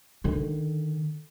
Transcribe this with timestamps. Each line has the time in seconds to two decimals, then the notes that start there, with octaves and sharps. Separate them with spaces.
0.24 D3 D#3